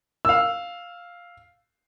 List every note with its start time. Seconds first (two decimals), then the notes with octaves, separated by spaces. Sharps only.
0.25 F5 E6